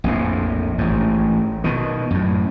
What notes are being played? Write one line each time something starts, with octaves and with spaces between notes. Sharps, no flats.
A#1 F2 A2
A1 G#2
B2 D#3
F#2 A2